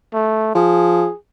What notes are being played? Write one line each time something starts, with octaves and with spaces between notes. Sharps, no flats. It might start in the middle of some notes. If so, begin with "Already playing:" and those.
A3
F3 G#4